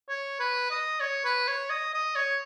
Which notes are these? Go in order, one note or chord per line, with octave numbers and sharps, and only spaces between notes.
C#5
B4
D#5
C#5
B4
C#5
D#5
D#5
C#5